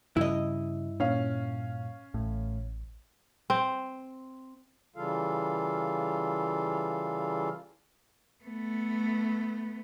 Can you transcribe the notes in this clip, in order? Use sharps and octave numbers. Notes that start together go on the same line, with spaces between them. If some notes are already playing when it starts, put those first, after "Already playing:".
G2 C#3 E4 D#5
A#2 C#4 F5
A1 A2
C4
C#3 E3 G3 F4 A4 F5
A3 B3